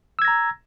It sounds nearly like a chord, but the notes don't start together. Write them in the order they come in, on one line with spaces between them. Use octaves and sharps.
E6 G#6 A#6 A#5